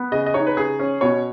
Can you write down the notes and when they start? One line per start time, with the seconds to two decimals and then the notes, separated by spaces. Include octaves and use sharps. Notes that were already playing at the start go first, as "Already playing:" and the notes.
Already playing: B3
0.12 C#3 D#5
0.26 D#5
0.34 D#4 C#5
0.47 B4
0.57 C#3 G#4
0.79 C#4
1.01 B2 C#5